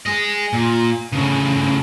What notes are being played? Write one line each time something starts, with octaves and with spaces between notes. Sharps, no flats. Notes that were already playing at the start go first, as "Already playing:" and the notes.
G#4 D#5
A#2
A2 C#3